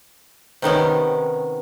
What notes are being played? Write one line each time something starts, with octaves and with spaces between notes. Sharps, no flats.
C3 D#3 B3 C#4